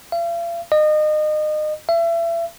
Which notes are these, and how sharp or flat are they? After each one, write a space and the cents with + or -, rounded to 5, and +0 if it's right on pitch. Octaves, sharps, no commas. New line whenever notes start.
F5 -45
D#5 -30
E5 +35